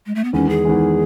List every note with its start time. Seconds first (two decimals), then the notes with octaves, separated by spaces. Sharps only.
0.06 G#3
0.15 A3
0.24 B3
0.33 E2 D#3 G#3 C#4
0.49 G#4
0.65 E2 D#3 G#3